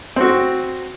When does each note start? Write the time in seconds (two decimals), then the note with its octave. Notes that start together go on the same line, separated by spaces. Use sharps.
0.16 C4 F#4